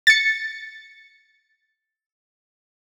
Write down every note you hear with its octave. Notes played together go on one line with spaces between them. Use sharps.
A6 C#7